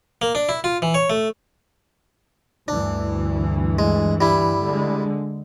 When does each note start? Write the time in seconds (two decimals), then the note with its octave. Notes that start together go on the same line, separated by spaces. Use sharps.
0.22 A#3
0.35 D4
0.49 E4
0.64 F4
0.82 E3
0.94 C#5
1.10 A3
2.68 D2 G2 E3 D4
3.79 G#3
4.21 G3 E4
4.61 D3 G#3